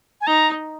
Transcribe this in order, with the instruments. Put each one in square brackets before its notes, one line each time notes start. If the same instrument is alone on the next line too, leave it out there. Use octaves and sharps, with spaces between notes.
[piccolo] G#5
[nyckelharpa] D#4 [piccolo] A#5